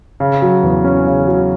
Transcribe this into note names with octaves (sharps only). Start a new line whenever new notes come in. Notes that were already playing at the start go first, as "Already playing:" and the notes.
C#3
F#3
E2
C#4
C#3
F#3